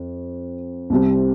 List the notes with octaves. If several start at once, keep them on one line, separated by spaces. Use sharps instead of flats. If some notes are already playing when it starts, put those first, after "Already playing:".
Already playing: F2
C2 C3 G3